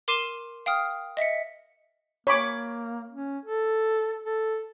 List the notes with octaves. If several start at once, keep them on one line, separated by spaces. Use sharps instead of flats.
A#4 C6 D6 C7 D#7 E7
F5 G5 D#6 F6
D#5 E5 B6 C#7
A#3 C#5 B5 D6
C#4
A4
A4